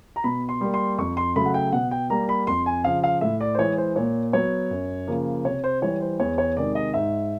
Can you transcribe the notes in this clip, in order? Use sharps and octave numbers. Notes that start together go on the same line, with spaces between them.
A#5
B2 B5
C6
G3 A#3
C6
F2 C#6
C6
C#3 F#3 A3 B5
F#5
G5
B2 F#5
G5
G3 A#3 A#5
B5
F2 C6
G#5
C#3 F3 F5
F5
A2 E5
D5
C5
E3 G#3 C#5
C5
A#2 C#5
F#3 B3 C#5
F#2
C#3 F3 A#3
C3 C#5
C5
E3 G3 C#5
C5
E2 C#5
C#5
C3 D#3 G#3 D5
D#5
G#2 E5